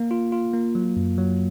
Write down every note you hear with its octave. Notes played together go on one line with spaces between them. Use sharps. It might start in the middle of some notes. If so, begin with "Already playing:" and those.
Already playing: A#3
F4
F4
A#3
F#3
F#2
F#3